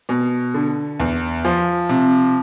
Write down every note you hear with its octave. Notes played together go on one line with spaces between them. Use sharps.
B2
D3
E2
F3
C3